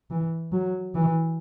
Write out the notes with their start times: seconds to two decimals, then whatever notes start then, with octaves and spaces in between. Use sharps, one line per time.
0.11 E3
0.52 F#3
0.95 E3